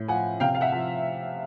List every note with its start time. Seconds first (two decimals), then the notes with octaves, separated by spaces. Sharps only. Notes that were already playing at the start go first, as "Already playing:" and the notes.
Already playing: A2
0.08 F3 F#5 G#5
0.40 C3 F5 G5
0.55 F5
0.61 E5 F#5
0.72 F3